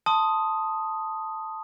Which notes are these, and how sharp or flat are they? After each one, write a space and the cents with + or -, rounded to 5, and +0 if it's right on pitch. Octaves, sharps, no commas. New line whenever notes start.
A5 +0 C6 +0 D#6 +0